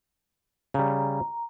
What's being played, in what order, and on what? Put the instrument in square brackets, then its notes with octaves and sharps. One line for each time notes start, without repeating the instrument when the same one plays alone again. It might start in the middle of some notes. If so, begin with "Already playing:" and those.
[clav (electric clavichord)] C#3 G3 [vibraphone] A#5